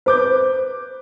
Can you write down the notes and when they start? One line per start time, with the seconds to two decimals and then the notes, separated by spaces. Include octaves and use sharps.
0.06 B4 C5 D6 G6